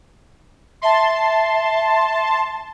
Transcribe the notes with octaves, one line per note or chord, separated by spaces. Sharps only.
E5 A5 C6